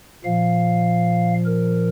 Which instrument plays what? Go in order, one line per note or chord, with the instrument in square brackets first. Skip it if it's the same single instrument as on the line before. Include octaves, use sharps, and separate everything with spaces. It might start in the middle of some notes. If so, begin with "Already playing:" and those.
[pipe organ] A#2 F3 F5
A#4